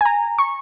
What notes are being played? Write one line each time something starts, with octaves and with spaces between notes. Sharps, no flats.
G#5
A#5
C#6